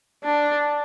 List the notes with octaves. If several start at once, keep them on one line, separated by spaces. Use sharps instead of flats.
D4